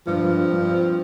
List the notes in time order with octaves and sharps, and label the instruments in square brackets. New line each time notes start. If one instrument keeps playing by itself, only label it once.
[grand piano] G2 [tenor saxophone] F3
[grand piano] G2
C4
G2
C4